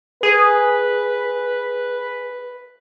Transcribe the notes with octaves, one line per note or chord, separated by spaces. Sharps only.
G#4 B4